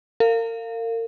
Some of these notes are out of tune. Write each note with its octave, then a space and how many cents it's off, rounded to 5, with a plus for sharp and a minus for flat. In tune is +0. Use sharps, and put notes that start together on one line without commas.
A#4 -35 F5 +0